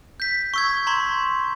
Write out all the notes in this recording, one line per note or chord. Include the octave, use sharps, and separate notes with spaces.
G6 B6
C#6 E6 G#6
A#5 C6 C#6 G#6